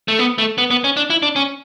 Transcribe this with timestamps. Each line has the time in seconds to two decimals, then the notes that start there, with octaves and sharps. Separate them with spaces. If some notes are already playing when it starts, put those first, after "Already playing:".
0.08 A3
0.19 B3
0.38 A3
0.58 B3
0.71 B3
0.84 C#4
0.97 D4
1.10 E4
1.23 D4
1.36 C#4